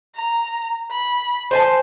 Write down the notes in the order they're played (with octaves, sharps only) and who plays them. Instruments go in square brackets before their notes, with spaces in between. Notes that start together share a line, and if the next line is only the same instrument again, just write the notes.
[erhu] A#5
B5
[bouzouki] C5 G#5 A5 [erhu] C6